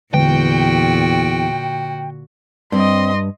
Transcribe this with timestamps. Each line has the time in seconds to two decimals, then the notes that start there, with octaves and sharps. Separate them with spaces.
0.14 E2 A#2 D3 F#4 G5
2.72 G2 G3 C4 D#5 C6